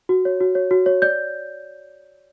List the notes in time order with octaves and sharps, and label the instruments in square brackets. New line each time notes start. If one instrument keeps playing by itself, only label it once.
[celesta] F#4
C#5
F#4
C#5
F#4
C#5
D5 G6